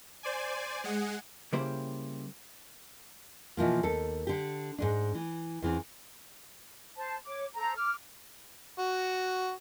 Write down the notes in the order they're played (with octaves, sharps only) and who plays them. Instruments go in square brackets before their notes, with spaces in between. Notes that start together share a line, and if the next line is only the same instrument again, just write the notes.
[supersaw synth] C5 D5 G#5
G#3 G#4 F#5
[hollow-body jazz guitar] C#3 G3 A#3 E4 G4 C5
[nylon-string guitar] B2 E3 F3 A#3
D#2 A4
D3 G4
G#2 G#3 D4
E3
E2 E3 C4
[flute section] C5 A5
C#5 D6
A4 C5 A#5
D6 F6
[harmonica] F#4